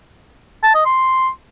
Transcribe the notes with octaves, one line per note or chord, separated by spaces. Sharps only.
A5
D#5
C6